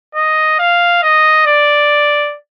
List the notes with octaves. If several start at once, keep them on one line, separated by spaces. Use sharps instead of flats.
D#5
F5
D#5
D5